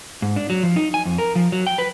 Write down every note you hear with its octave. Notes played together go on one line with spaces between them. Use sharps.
G#2
D4
F#3
F3
D#4
G#5
F2
A#4
F3
F#3
G5
B4